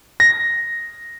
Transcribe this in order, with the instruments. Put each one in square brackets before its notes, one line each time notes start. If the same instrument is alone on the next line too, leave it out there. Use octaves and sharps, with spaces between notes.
[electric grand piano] A#6